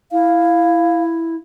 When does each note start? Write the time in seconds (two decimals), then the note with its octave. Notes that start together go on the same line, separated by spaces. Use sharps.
0.12 E4 F5